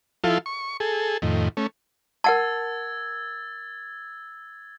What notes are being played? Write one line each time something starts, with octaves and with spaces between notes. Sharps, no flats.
F3 E4 F4 A4
C#6
G#4 A4
F2 A2 D#3
A3 C#4
A#4 F#5 A5 E6 G#6 A6